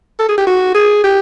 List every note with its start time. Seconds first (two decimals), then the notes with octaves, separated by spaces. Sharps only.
0.19 A4
0.29 G#4
0.38 G4
0.47 F#4
0.75 G#4
1.04 G4